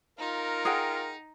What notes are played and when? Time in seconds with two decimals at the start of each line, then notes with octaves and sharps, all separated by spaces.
0.19 D#4 F4 A#4
0.65 G#4 F#5 G5